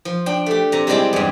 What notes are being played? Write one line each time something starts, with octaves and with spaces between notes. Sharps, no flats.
F3
D4 G5
A3 G4
C3 A#5
G3 G#3 C4 D4 E4 G4
E2 G2